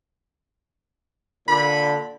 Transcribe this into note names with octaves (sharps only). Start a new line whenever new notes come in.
A#2 D3 B5